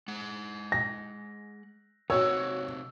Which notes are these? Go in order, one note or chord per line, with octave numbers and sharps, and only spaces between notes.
G#3 F#5
A#6
C3 C4 D#4 F#4 C#5 E6